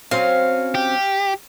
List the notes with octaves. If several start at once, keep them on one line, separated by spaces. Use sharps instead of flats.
F#3 C4 C#4 F5
G4